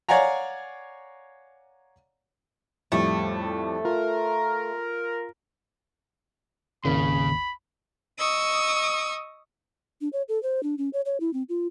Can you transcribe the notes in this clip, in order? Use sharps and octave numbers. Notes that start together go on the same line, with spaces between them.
C#5 D5 F5 F#5 G#5 A#5
F2 A2 G3 A3
F4 A#4
G#1 D#2 C#3 B5
D#5 C#6 D#6 E6
D4
C#5
A4
C5
D4
C#4
C#5
C#5
E4
C4
F4